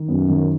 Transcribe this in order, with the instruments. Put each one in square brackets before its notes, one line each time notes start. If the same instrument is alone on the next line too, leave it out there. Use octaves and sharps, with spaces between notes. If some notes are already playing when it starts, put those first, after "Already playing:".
Already playing: [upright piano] D#3
[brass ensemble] F#2 [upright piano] B3
[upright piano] D#3